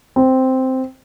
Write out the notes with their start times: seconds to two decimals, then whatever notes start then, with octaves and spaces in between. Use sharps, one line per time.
0.16 C4